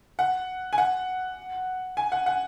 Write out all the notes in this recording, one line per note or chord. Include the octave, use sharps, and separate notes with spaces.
F#5
G#5
F#5
G#5
F#5
F#5